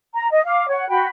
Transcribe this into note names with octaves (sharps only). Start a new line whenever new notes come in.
A#5
D#5
F5 D6
C#5 F#5
F#4 G5 B5